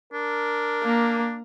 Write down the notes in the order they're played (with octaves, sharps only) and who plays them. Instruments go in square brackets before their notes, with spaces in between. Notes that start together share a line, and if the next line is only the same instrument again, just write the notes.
[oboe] D4 [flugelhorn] A#4
[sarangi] A#3